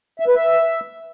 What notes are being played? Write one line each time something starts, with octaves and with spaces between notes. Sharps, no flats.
E5
B4
E5